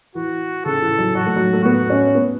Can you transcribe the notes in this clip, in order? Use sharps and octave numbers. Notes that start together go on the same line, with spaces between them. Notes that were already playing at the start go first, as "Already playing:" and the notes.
E3 F#4
C#3 A4
E3
F#3
F#3 F#4
A3
F#3
A3
B3 F#4
C#4
B3